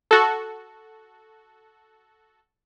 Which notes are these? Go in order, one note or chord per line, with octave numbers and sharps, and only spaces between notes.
F#4 A4